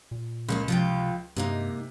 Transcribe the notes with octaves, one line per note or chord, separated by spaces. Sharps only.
A#2
C#2 G#3 A#3 E4
C3 F3 F4 G5
G2 C3 G#3 A#3 D#4